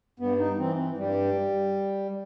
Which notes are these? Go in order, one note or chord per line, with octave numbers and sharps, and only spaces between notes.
G2 B3
D#4
E3 C4
G2 G3